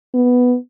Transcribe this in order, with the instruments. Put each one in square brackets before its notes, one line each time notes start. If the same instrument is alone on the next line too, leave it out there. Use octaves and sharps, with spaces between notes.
[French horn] B3